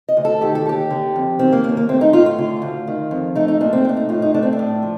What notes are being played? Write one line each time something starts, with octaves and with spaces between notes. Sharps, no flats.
D#5
D2
A4
D#3 G4
A4
D#2 G4
D3
F2
D#3 C4
A#3
D#2 A#3
A#3
A3 C4
D#4
A2 F4
F4
D3
D2
D#3
F2
A3 D#4
D#4
A#2 D4
C4
A3 D4
D#4
A2 F4
D#4
A3 D4
C4
D4
A2
F3